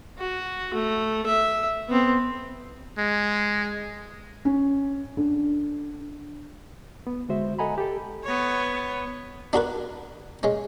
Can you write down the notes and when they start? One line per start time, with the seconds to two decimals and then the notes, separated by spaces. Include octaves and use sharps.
0.18 F#4
0.74 A3
1.26 E5
1.88 B3 C4
2.98 G#3
4.45 C#4
5.17 D3
7.07 B3
7.29 D3 G#3 F#4 C5 E5
7.59 A4 D#5 F#5 G#5 A#5 B5
7.78 G4 A4
8.24 B3 C#5
9.53 D4 F#4 A#4 B4
10.43 G#3 C#4